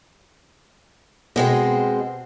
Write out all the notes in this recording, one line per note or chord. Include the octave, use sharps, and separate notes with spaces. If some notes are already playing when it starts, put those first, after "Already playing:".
B2 G#3 C4